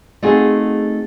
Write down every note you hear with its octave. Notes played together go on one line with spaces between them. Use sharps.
A3 C4 D#4 F4 F#4 G#4